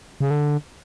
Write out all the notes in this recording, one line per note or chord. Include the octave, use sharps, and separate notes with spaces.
C#3
D3